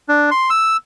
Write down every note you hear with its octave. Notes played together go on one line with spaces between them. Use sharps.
D4
C6
E6